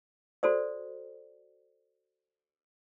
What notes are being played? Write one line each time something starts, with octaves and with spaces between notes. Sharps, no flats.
F#4 A4 C5 D5